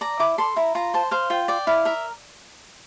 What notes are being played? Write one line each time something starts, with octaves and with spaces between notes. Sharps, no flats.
D5 A#5
E4 D6
A4 C6
E4 A#5
F4 A#5
C5 A5
C5 F5
F4 G5
D5 G5
E4 F5
A#4 E5